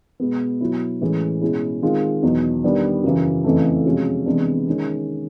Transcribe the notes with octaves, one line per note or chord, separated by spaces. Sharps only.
B2 G#3 B3
B2 F#3 B3 E4
A2 E3 G#3 C#4
B2 G#3 C#4 E4 G#4
D#3 G#3 C4 F4
E2 B2 F#3 B3 D#4
D#3 G3 B3 D4
F#2 C#3 E3
F2 C#3 E3 A3
C3 F3 G#3 C#4 F#4
C3 E3 G#3 B3 D4
D#3 G#3 C#4